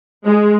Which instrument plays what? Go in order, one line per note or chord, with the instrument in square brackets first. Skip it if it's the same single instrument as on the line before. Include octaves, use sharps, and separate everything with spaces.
[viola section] G#3